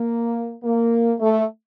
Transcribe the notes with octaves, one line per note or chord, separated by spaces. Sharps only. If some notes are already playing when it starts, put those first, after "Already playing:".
Already playing: A#3
A#3
A3